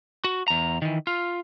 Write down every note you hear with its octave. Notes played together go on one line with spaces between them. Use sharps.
F#4
E2 A#5
D#3 E3
F4